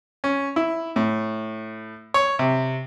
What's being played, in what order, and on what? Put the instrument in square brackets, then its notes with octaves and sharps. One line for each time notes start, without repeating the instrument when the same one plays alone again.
[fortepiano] C#4
E4
A2
C#5
C3